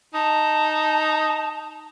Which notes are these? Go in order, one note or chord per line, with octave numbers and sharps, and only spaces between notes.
D#4 A5